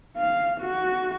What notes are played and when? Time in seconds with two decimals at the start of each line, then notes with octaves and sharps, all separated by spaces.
0.17 F5
0.61 F#4